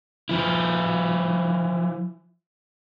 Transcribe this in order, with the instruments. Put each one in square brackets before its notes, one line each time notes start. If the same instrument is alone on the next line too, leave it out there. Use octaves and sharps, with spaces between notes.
[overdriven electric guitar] F3 E4